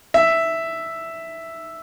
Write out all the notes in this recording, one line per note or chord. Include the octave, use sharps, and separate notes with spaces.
E5